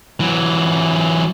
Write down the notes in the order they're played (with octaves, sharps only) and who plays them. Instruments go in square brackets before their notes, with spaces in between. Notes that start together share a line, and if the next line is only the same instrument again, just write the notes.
[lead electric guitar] E3 F#3